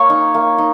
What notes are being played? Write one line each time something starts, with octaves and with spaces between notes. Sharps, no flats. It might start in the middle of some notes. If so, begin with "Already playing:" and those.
Already playing: A#3 C#5 C#6
D#4
A#3
D#4